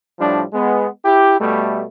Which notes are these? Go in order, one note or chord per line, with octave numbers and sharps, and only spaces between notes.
A2 F3 G3 D4
G#3 B3
E4 G4
B2 G3 A3